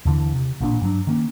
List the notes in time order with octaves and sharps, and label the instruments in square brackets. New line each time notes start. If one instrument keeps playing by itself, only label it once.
[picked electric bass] D#2 D3 E3
C3
A1 A#2 D4
G2 F#3 D4
D#3 A#3 C#4